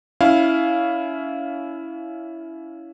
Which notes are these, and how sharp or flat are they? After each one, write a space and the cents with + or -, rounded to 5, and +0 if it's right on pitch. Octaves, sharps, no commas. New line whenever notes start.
C#4 +30 E4 +0 F5 +0